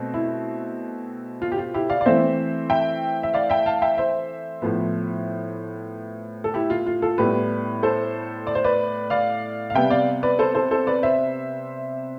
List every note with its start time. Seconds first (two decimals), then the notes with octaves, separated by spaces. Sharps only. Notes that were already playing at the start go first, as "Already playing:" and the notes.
Already playing: B2 A3 C4
0.14 E4
1.42 F4
1.52 G4
1.58 F4
1.74 E4 G4
1.90 D5 F5
2.01 D5
2.05 E3 A3 C4 C5 E5
2.70 E5 G5
3.23 E5
3.34 D5 F5
3.50 E5 G5
3.66 F5 A5
3.82 E5 G5
3.98 C5 E5
4.62 A2 F3 B3
6.44 A4
6.54 E4 G4
6.70 F4
6.86 F4
7.02 F4 A4
7.18 A2 G3 B3 G4 B4
7.83 A4 C5
8.47 D5
8.55 C5
8.64 B4 D5
9.10 D5 F5
9.70 F5
9.75 C3 G3 B3 E5 G5
9.90 D5 F5
10.23 B4 D5
10.39 A4 C5
10.55 A4 C5
10.71 A4 C5
10.87 B4 D5
11.03 C5 E5